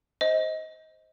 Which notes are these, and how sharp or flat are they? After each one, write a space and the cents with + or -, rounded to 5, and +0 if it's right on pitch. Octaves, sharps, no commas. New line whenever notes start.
C5 +0 D#5 +20